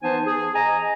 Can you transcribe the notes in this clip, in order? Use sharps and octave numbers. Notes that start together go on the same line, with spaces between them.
E3 B3 D#4 C5 G#5 A5
G#4
D#5 G#5 A#5